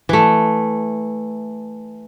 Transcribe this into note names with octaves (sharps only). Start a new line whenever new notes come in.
E3 A3